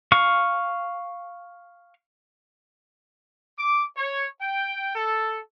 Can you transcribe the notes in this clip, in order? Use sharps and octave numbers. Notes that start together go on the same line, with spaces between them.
F5 C#6
D6
C#5
G5
A4